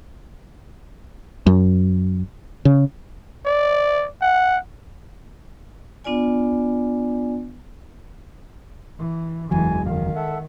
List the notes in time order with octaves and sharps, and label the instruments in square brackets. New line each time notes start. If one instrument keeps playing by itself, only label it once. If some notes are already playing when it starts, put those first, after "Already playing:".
[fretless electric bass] F#2
C#3
[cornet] D5
F#5
[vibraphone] B3 D4 F4 D5 G#5
[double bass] E3
[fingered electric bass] F#1 E2 F#3 [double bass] E3 G#3 [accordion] G#5
[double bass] D#3 [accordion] F5
[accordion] A4 E5 F#5